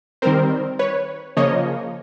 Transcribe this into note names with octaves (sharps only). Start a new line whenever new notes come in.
D#3 G3 C4 A#4 C5
B4 C#5
C#3 F3 A#3 C#5 D#5